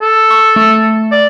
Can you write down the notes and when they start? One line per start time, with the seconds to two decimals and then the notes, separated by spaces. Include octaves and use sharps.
0.02 A4
0.31 C#6
0.56 A3
1.11 D5